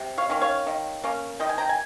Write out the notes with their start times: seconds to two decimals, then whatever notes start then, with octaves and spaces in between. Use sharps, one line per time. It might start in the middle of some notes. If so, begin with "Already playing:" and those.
Already playing: C3
0.18 C#5 F5
0.30 D#3 A#3 C#4
0.41 C#5 F5
0.67 D#3
1.04 A#3 C#4
1.40 D#3 D#5 G5
1.49 G#5
1.58 G5 A#5
1.69 G#5